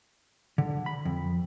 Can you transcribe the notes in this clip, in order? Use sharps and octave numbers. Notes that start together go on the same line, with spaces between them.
D3
B5
F2